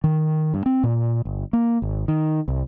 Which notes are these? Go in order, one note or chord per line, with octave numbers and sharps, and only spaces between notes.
D#3
G2
C4
A#2
G1
A#3
G#1
D#3
C2